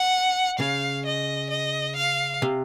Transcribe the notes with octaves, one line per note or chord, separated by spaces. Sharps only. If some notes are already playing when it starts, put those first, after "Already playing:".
Already playing: F#5
C#3 F5
D#5
D#5
F5
C3